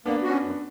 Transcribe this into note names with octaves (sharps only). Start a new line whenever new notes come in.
A#3 B3 D4
C#4 F#4
F#2